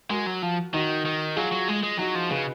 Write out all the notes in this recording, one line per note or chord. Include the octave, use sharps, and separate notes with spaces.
G#3 F#4 A#4
F#3
F3
D#3 D#4 F#4
D#3
F#3 F4 G#4
F#3
G#3
G#3
F#3 D#4 F#4
F3
C#3 G#4 B4